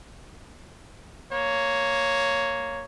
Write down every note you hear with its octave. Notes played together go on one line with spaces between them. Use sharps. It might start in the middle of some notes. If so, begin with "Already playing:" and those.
A#3 C#5